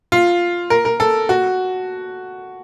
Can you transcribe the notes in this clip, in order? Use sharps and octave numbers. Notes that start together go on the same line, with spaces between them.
F4
A#4
A#4
A4
F#4